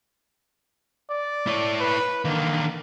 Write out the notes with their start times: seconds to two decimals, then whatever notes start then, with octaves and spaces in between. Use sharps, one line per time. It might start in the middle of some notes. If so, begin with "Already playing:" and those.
1.10 D5
1.47 E4 C#5
1.81 B4
2.25 D3 D#3 A#3